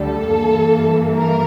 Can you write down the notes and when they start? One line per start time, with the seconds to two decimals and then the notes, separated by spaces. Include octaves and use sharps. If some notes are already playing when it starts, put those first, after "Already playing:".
Already playing: D2 D3 G3 A4
0.31 G2 E3 A#3
1.17 A#4